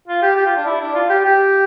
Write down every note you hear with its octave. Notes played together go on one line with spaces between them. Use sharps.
F4
G4
G4
F4
D4
E4
D4
F4
G4
G4